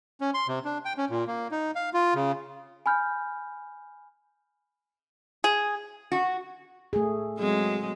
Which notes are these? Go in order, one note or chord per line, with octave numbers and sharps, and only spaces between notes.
C#4
C6
C3
D4
G5
C#4
A#2
A#3
D#4
F5
F4
C#3
G#5 B5 F6 G6
G#4
F#4
A3 G#4
F#3 G#3 C4